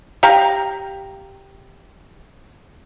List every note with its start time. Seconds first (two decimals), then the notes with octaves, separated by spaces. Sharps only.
0.23 G4 F5 A#5